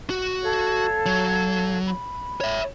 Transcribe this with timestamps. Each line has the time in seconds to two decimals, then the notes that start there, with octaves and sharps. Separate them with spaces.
0.10 F#4
0.42 A4 C#5 F5
1.06 F#3
1.86 B5
2.41 C#5 E5